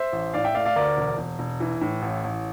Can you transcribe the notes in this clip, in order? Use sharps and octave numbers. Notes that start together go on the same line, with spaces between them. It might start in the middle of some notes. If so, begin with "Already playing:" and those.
Already playing: C5 E5
A1
A2 D5 F5
E5 G5
A3 D5 F5
D5 F5
D2 A#4 D5
E1
E1
E1
E3
A2
A1
A1